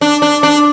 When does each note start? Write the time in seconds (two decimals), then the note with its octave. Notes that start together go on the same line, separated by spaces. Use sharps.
0.01 D4
0.22 D4
0.43 D4